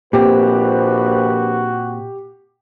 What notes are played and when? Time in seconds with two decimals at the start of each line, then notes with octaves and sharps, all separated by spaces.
0.13 A#1 A#2 C4 F#4 G4 B4 C5